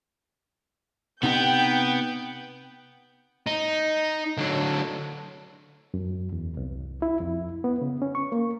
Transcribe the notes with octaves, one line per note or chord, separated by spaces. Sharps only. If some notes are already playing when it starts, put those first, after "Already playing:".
C3 B3 D#4 G5 A#5 G6
D#4
D3 F#3
F#2
E2
C2
E4
F2
B3
C#3
C#4
C#6
A#3